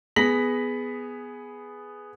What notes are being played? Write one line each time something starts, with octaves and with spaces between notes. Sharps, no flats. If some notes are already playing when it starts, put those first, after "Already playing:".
B3 G#4 A#6 B6 F#7